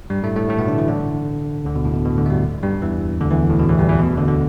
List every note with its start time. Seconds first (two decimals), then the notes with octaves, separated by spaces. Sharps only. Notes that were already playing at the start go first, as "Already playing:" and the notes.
0.10 G2 G3
0.23 A2 A3
0.36 A2 A3
0.49 A2 A3
0.59 B2 B3
0.68 D3 D4
0.78 E3 E4
0.88 D3 D4
1.65 D2 D3
1.75 B2
1.85 A2
1.94 B2
2.05 B2
2.17 D2 D3
2.26 A3
2.30 G2 G3
2.63 G2 G3
2.82 E2 E3
3.21 D2 D3
3.30 E2 E3
3.50 A2
3.59 B2
3.69 E2 E3
3.78 G2 G3
3.89 E2 E3
3.99 B2
4.17 D2 D3
4.28 D3